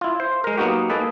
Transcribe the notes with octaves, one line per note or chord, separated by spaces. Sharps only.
E4 F4
C5
G#3 A#4
F#3 A#3 B3 D#4 F#4 G4
A#3 D#4 G#4 A4 B4